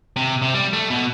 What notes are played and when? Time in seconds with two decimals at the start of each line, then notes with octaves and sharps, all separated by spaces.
0.16 C3
0.42 C3
0.54 G3
0.73 A3
0.90 B2